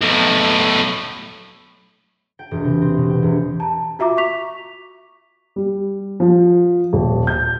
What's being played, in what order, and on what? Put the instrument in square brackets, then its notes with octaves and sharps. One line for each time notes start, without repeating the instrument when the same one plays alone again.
[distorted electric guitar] B1 A2
[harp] G5
E1
C3
C4
B2
G5
E1
[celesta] A5 A#5
F4 F#4 E5 A#5 D6
E5 C#6 B6 F7
[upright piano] G3
F3
D#1
G6